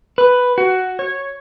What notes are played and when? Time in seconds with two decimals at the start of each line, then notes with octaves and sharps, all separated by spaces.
0.18 B4
0.58 F#4
0.99 C#5